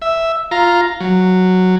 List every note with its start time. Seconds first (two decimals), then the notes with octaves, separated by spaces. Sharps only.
0.02 E5
0.51 F4 A#5
1.00 F#3